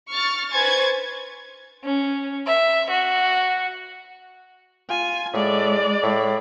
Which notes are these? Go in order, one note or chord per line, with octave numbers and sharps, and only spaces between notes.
C#6 F6 A6
B4 C5 G#5 C#6 G#6 A6
C#4
E5
F#4
F4 G#5
A2 G#3 D5
A2